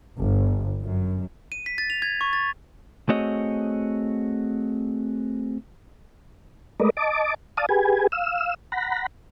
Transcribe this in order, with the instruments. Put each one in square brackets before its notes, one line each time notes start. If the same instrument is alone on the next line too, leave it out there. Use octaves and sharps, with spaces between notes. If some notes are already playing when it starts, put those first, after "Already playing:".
[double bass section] G1
F#2
[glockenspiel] D#7
B6
A6
F7
G#6
C#6
A6
[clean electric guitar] A3 C4 F#4 G#4 C#5 D#5
[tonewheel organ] G#3 A3 A#4 B4 D5 D#5
D#5 A5 D6
D5 F5 A5 D#6
G4 G#4 B4 G#5
F5 E6
F#5 A#5 B5